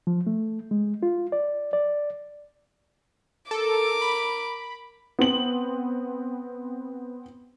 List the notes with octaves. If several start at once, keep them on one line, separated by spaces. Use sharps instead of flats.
F3
A3
G#3
F4
D5
D5
A4 A#4 D6
B5
B3 C4 F#7